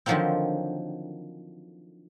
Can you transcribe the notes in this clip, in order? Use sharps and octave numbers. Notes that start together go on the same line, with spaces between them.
D3 D#3 F3 F#3 A#3 C4